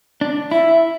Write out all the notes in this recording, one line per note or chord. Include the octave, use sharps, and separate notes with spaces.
D4
E4 E5